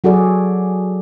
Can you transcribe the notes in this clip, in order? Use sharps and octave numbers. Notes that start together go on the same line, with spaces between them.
F#3 F#4 G#4 A4 D5